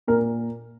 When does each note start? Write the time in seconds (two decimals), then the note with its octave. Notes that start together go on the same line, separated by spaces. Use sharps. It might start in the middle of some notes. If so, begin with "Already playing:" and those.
0.08 A#2 A#4